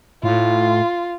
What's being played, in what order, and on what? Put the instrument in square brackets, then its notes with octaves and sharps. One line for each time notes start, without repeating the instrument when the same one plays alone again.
[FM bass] A2 [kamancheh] F4